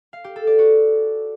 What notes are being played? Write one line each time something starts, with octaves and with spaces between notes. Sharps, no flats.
F5
G4
A4
D5
F#4